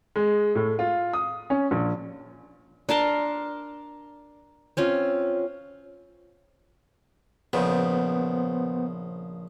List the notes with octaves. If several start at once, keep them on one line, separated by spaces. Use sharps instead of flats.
G#3
A2
F4
D#6
C#4
A#1
D4 A#4 A5 C6
C4 C#4 F4
A#1 C#3 B3 C5